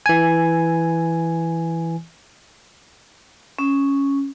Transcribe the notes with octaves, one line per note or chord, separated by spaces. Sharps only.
E3 G#5
C#4